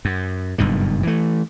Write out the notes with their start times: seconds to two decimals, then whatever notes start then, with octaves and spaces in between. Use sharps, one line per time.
0.05 F#2
0.58 F#1 G2 B2 D#3
1.03 E3 A3